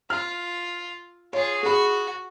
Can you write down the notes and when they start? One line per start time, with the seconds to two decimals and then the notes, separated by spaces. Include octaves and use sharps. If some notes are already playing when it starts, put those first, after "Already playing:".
0.10 F4 F6
1.33 F4 G#4 C#5
1.63 F#4 G#4 B5